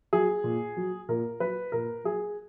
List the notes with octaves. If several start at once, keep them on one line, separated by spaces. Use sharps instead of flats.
F#3 G#4
A#2
F#3
A#2 A#4
F#3 B4
A#2 A#4
F#3 G#4